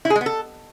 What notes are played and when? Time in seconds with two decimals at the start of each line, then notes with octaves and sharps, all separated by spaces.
0.05 E4
0.10 G#4
0.16 G#3
0.21 B3
0.26 A4